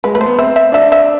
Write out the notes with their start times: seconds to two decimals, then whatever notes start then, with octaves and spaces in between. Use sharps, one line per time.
0.04 G#3 B4
0.15 A3 B4
0.21 C5
0.26 B3
0.39 C4 E5
0.56 E5
0.72 D4 E5
0.92 E5